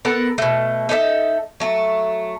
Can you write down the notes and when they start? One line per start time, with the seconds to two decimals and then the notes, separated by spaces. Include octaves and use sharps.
0.05 B3 A4 A#4 F#5
0.38 B2 A3
0.89 D#4 A4 B4 E5
1.60 F#3 A3